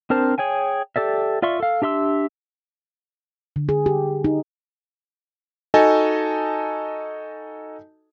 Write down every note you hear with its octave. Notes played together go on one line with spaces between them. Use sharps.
C4 D4 A#4 C5 A5
G#4 C#5 G5 G#5
G4 A4 D5 E5
F4 D5 E5 C6 C#6
A4 F5
D4 G4 E5 C6 E6
D3
G#4
G4
D#4
D#4 F#4 A4 D#5 G#5 A5